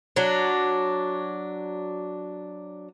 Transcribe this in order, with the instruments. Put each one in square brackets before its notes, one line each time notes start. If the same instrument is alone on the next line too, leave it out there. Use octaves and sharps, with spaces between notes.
[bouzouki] F#3 D4